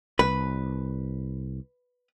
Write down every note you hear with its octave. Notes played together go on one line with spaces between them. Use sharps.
C2 B4